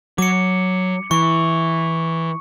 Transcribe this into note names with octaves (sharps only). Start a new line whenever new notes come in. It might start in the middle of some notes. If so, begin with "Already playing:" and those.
F#3 D6 C#7
E3 C#6